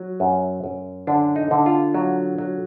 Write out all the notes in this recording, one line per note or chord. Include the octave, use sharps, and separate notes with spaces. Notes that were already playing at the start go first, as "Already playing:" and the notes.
Already playing: F#3
F#2
F#2
D3 D4
D#4
D3
F4
F#3
F#3